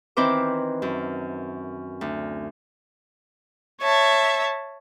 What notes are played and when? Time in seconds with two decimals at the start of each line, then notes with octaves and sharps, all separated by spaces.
0.17 D#3 E3 C4 B4 C5 D6
0.82 F#2
2.01 D2
3.80 C#5 E5 A5